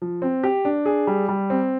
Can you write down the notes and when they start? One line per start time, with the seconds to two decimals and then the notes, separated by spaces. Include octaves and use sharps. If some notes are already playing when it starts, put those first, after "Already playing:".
0.02 F3
0.22 C4
0.43 G4
0.65 D4
0.86 G#4
1.07 G3
1.29 G3
1.50 C4